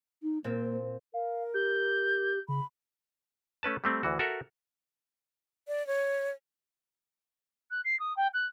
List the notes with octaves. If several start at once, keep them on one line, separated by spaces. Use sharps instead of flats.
D#4
A#2 A#3 C4
A#4 F5
G4 G6
C#3 B5
A3 C#4 B4 A5
G3 A3 C4
D2 E3 F#4
F#4 A4 A#4 E5 F#5
D5
C#5
F#6
C7
D#6
G5
F#6